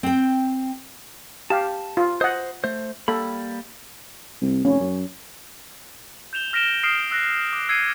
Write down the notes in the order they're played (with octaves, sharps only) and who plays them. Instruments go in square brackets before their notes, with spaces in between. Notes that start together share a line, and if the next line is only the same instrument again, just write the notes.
[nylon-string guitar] C4 G5
[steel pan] G4 F5 [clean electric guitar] A5
[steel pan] F4
[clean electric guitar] C5 [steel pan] D#5 F#5
[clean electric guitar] A3 C5
[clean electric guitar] G3 A#3 B5 [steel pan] A4
[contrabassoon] C2
[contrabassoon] F1 [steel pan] C#4
[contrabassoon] F#2
[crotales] G6 E7 F7 G7
F6 A#6 B6 D7 E7 G7
D#6 F6 C7 D7 E7 F7
E6 F#6 A#6
D6
E6 G#6 C7 C#7 D#7